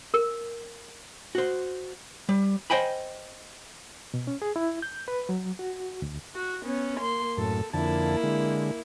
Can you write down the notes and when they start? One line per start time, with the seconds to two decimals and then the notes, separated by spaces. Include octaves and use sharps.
0.14 A#4
1.35 F#4 C5
2.29 G3
2.70 C5 D#5 G5 G#5 B5
4.14 B2
4.27 C#4
4.42 G#4
4.56 E4
4.82 G6
5.08 B4
5.29 F#3
5.59 F#4
6.02 D2
6.35 F#4
6.64 B3 C#4
7.00 A#3 C6
7.38 F#2 A2 A4
7.73 F2 D3 A#3 E4 A5
8.23 D3 G#3